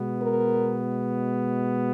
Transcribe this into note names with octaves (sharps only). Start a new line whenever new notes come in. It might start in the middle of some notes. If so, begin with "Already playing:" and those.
Already playing: B2 G#3 B3
A#4